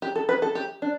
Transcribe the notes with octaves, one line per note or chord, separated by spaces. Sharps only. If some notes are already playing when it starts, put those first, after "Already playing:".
G4
A4
B4
A4
G4
D4